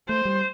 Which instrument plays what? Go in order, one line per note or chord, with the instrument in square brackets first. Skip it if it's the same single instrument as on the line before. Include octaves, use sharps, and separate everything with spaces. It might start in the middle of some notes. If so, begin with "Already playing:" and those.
[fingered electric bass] A3 [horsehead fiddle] C5
[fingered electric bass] G3